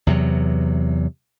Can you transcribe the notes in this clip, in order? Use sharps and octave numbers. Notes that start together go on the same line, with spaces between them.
E2 C3 F#3